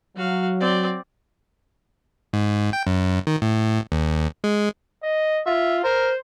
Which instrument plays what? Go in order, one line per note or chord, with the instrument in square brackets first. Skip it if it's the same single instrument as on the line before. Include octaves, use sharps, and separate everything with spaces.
[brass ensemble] F#3 [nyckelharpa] F#4 F5
[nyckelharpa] C4 D5
[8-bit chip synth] G#2
G5
F#2
D#3
A2
D#2
G#3
[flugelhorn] D#5
[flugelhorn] F4 [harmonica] E5
[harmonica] A#4 [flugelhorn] C5